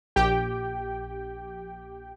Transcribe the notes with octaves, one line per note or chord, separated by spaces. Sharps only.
A#1 G4 G5